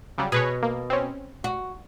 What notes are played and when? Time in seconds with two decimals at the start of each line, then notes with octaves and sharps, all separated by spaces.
0.18 C#3 F#3 G3
0.32 B2 G#4 B4 C#5
0.63 A#3
0.90 C4 C#4
1.44 F#4